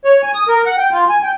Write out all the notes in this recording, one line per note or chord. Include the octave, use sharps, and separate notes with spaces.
C#5
G#5
D#6
A#4
F#5
G5
F4
G#5
G5